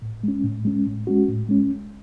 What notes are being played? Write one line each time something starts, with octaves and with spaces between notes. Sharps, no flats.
A2
G#3 C#4
A2
G#3 C#4
A2
G#3 C#4 F#4
A2
G#3 C#4